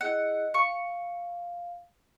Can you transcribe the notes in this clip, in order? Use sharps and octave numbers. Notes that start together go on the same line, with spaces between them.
E4 G#4 D#5 F#5
F5 C#6